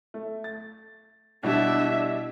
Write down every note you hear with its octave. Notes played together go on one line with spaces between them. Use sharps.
A3
A6
B2 G3 D4 E4 E5